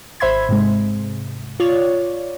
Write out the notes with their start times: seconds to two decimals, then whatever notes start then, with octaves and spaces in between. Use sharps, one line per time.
0.20 G#1 C5 E5 B5 C6 G#6
0.49 G#2 C3 G#3
1.60 F4 C#5 D5